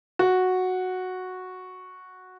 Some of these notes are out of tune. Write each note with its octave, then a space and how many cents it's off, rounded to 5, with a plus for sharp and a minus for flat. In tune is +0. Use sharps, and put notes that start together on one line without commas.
F#4 -5